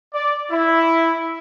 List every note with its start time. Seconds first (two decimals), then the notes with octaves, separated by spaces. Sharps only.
0.13 D5
0.51 E4